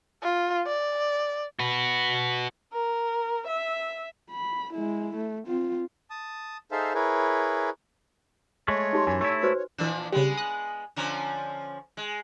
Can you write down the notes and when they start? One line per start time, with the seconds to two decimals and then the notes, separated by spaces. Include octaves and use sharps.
0.23 F4
0.66 D5
1.59 F#4 B4
2.74 A#4
3.49 E5
4.31 B5
4.74 G#3 E4
5.16 A3
5.47 C4 F4
6.10 A5 D#6
6.71 D#4 G#4 A4 C5 E5 F5
6.95 E4 G#4 A#4 B4 C#5
8.68 G#3 A3 C#5 C#6
8.93 D#4 G4 C6
9.07 F#2 E3 G#5
9.21 A3 E4
9.43 F#4 B4 C5
9.78 A#2 E3 F3 D4 E6
10.12 C#3 G3 G#3 B3
10.37 D#6 F#6
10.96 D3 F3 C#4 A#5 G#6 E7
11.97 G#3